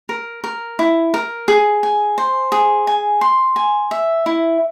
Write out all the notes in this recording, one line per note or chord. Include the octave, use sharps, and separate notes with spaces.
A#4
A#4
E4
A#4
G#4
G#5
C5
G#4
G#5
C6
G#5
E5
E4